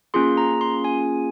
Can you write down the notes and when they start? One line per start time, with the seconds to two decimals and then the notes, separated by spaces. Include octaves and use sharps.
0.14 A#3 C#4 F4 G#4 C6
0.37 A#5
0.61 C6
0.84 G#5